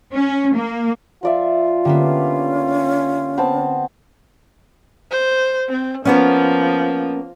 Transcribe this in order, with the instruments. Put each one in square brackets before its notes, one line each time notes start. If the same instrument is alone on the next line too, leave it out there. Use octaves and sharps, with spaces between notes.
[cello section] C#4
A#3
[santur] F3 D5 E5 [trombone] F4
[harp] D3 A#3 B3 [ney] C#4 [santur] G4
[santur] B3 C5 A5 [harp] C4
[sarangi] C5
C4
[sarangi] F3 [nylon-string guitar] A#3 B3 C#4